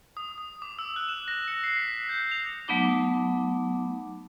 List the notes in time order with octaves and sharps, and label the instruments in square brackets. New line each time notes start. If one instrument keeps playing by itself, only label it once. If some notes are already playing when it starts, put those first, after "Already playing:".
[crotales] D#6
D#6
D6
E6
F#6
E7
A#6
C#7
C7
B6
G6
F7
[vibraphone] F#3 A3 B3 D#4 D6